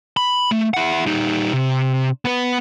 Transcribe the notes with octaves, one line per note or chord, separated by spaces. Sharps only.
B5
A3
E4 F#5
G3 D#4
C3
B3 B4